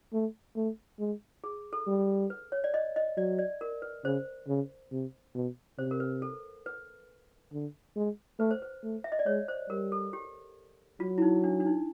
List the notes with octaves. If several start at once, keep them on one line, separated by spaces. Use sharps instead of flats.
A3
A3
G#3
G#4
A4
G3
B4
C#5
D5
D#5
D#5
F#3 D5
D5
A#4
B4
C#3 C5
C#3
C3
B2
C3 C5
A#4
B4
A4
B4
D3
G#3
A3 B4
C5
B4
A3
E5
D#5
D5
G#3 C#5
C5
G3 A#4
A4
G4
F#3 F4
E4
D#4
D4
D4
D#4